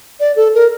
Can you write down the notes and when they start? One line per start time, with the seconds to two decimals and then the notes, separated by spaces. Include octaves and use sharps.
0.20 D5
0.36 A4
0.54 A#4